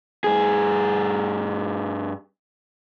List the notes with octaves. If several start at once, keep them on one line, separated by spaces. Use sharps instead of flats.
G2 G#4